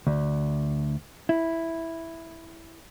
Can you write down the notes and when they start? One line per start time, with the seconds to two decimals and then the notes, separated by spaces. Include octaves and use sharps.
0.07 D2
1.29 E4